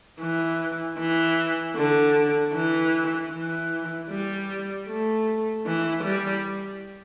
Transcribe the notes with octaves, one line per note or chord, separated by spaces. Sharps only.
E3
E3
D3
E3
E3
G3
A3
E3
G3